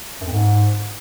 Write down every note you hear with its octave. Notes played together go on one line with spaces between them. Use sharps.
F#2
F2
G#2